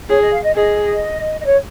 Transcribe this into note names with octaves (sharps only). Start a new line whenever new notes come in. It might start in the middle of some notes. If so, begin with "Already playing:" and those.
G#4 C#5
D#5
F5
D#5
G#4 D#5
D#5
C#5